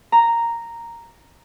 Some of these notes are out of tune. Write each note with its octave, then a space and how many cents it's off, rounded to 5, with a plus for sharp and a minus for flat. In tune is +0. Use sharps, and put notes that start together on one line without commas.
A#5 -5